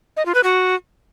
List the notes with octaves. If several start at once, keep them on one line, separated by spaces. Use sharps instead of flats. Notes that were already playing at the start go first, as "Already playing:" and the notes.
D#5
F4
B4
F#4